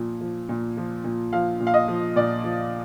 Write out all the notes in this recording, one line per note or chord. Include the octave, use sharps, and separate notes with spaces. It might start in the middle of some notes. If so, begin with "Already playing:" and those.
Already playing: A#2 F3
F3
A#2
F3
A#2
F3 F5
A#2
F5
D#5
F3
A#2 D5
F3